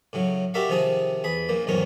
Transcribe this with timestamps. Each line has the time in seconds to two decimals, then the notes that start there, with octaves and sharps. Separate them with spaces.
0.13 A2 C#3 F#3
0.54 F#4 G4 A#4 D5 E5 F5
0.69 C3 D#3 F3 D#4 G#4
1.24 E2 G#4 B5
1.49 A#1 A#2 A#3
1.67 B1 E2 G#2 D#3 C#4 A#4